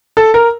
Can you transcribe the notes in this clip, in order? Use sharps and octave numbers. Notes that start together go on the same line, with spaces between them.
A4
A#4